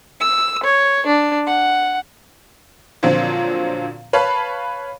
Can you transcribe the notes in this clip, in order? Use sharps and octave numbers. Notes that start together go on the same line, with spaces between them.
E6
C#5
D4
F#5
A#2 D3 F3 F#3 C4
B4 C#5 F5 A5 B5